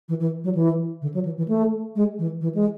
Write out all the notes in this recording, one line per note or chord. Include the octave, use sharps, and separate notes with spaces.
E3
E3
F#3
E3
D3
F#3
E3
E3
A3
G#3
E3
E3
G#3